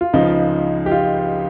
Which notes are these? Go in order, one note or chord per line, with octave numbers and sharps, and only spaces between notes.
F4
C#2 C#3 F3 D#4
G4
F4